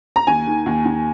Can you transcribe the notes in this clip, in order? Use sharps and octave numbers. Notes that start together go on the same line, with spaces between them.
A#5
D#2 G#5
D#3
D#2
D#2